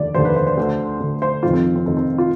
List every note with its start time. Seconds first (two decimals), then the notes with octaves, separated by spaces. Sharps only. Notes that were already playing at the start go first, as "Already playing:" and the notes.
Already playing: F1 D#2 D3 D5
0.14 F1 D#2 D3 C5
0.25 B4
0.36 C5
0.46 C5
0.57 D2 D3
1.00 D2 D3
1.22 C5
1.43 F1 F2 D#3 F4
1.53 C4
1.76 C4
1.86 F1 F2 D#3 C4
1.97 C4
2.18 F4